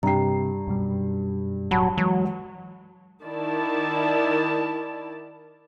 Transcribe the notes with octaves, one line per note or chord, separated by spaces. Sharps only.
G2 C3 G5 A#5 C7
F#2 B2 G3
E1 A2 F#3 F#5 A5 B5
E3 F#3 G#3
D#3 E4 D5 A5